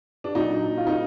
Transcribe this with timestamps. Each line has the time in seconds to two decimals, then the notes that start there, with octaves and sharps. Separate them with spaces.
0.24 D4
0.35 A#2 F#3 D#4
0.77 F4
0.87 D#4